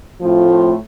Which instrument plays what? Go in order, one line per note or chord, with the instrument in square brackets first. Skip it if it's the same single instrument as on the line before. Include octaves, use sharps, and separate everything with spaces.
[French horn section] A2 F3 A3 C4 F4